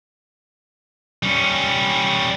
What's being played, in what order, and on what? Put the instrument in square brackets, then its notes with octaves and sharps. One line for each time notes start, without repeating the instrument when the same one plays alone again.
[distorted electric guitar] G3 C#4